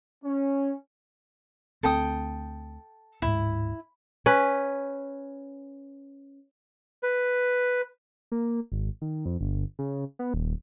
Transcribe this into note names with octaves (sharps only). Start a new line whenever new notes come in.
C#4
D2 C4 A4 G5 D#6
D1 G#2 E4
C#4 B4
B4
A#3
G#1
D#3
F2
G1
C#3
B3
D#1